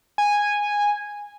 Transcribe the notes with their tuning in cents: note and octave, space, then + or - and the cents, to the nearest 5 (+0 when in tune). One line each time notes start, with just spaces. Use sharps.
G#5 -10